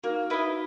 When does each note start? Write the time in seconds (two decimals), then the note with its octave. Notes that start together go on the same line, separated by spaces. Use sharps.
0.04 A#3 D#4 F#4
0.30 E4 B4 D#5